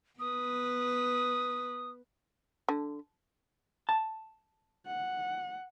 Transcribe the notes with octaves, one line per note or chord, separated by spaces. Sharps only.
B3 B4 D#6
D3
A5
F#5